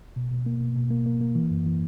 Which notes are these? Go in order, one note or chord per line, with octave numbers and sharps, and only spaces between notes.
B2
B2
A#3
B2
B2
A#3
A#3
A#3
E3
F#2
E3